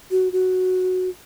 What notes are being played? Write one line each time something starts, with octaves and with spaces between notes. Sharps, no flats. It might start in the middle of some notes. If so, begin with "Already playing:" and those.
F#4
F#4